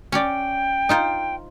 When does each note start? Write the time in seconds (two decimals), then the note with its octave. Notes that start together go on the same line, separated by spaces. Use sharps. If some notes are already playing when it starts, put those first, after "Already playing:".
0.12 C#4 C#5 D5 G5
0.89 D#4 F4 C5